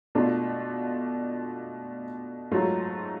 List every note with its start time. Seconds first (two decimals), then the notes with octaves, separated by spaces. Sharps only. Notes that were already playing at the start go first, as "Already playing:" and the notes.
0.15 B2 A3 D4 F4
2.51 G#2 F#3 A3 F4